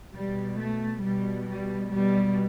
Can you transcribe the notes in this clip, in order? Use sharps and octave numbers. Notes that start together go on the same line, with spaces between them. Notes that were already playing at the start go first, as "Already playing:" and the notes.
B2 G3
A3
B2 G3
G3
B2 G3